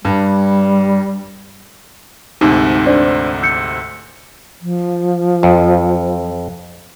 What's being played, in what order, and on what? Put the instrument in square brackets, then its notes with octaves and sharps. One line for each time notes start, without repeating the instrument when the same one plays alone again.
[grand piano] G2 [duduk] G3
[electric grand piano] D2 G#2 C3 [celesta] D#4
[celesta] D4 C5 D5
E6 G6 C#7
[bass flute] F3
[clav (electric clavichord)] F2